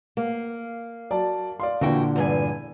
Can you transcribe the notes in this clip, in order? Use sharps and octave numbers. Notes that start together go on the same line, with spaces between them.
A#3
F#3 D5 A5
D5 F5 C6
A#2 D3 E3 F#4 G5
E2 G2 G#5